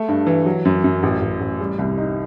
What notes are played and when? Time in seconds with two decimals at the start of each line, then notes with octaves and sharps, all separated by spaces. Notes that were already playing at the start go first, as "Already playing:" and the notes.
Already playing: A3
0.08 G2
0.27 E3
0.46 F#3
0.65 F#2
0.84 F#2
1.03 A1
1.21 A1
1.41 A1
1.60 G3
1.79 C2
1.98 D#4